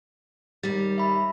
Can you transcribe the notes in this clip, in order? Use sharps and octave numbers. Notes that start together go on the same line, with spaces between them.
D#2 G3 A6
E5 B5